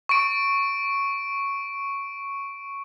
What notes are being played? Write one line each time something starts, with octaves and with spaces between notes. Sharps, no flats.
C#6 D7